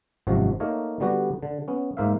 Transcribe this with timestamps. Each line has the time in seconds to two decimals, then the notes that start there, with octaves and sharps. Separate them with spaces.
0.27 G#1 F#2 C3 F3 F#4
0.60 A3 A#3 D#4 A#4 C#5
1.00 D3 G3 B3 F#4 G4
1.43 D3
1.68 B3 C#4
1.97 G#2 A#3 C5 E5 F5